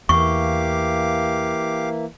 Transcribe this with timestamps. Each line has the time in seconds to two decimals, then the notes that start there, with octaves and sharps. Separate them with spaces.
0.09 E2 E3 A#3 G4 F5 C#6 D6